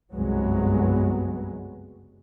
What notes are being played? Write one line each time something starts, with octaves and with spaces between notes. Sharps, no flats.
F#1 C2 G2 F#3 G#3 B3